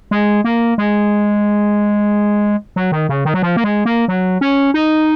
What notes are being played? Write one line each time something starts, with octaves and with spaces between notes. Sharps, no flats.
G#3
A#3
G#3
F#3
D#3
C#3
D#3
F#3
F3
A#3
G#3
A#3
F#3
C#4
D#4